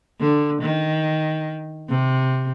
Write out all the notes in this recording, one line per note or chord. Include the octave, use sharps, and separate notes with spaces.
D3
D#3
C3